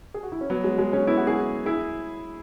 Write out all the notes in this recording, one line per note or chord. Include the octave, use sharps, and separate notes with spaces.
G#4
F#4
E4
C#4
F#3 B3
G#3
G#3
G#3 C#4
B3 E4
F#4
E4 G#4
E4 G#4